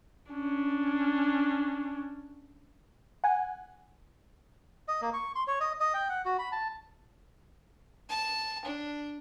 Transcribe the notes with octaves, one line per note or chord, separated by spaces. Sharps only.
C#4 D4
F#5 G#5
D#5
A#3
C#6
C6
C#5
D#5
D#5
G5
F#5
F#4
B5
A5
A5
D4